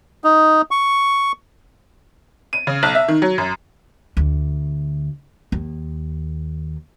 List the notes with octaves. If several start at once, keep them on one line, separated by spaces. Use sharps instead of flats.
D#4
C#6
D#7
C#3
B1
E5
D#3
F#3
F#2
D2
D#2